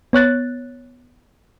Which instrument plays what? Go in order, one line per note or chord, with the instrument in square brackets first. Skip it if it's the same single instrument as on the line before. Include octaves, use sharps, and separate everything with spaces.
[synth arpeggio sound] B3 C#5 F#6 A6